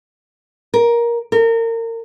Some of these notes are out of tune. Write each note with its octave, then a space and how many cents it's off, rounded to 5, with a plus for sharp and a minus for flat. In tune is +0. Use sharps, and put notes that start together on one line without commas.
A#4 +15
A#4 -30